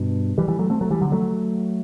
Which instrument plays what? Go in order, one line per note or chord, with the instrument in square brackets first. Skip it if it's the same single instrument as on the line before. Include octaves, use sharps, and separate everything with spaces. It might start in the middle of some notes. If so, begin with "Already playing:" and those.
Already playing: [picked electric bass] G2 B2
E3 G3
E3 G3
F#3 A3
A3 C4
F#3 A3
E3 G3
D3 F#3
F#3 A3